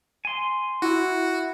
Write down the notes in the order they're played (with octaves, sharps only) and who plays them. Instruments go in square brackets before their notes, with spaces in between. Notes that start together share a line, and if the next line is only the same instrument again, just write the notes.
[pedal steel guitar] G#5 C6
[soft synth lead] E4 [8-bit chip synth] F#4